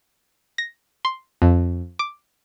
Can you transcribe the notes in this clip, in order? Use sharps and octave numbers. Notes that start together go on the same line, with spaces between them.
A#6
C6
F2
D6